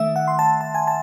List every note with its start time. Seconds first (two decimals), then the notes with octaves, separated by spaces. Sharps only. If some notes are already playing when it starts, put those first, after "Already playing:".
Already playing: D#3 A3 E5
0.16 F#5
0.28 C6
0.39 A5
0.61 A5
0.75 G#5
0.87 A5